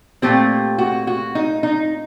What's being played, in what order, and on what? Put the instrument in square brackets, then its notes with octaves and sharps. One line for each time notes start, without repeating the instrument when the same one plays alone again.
[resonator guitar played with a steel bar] A#2 A3 C4 G4
F#4
F#4
D#4
D#4